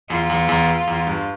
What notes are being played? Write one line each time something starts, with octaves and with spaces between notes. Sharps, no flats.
E2 F4
E2
E2
E2
G2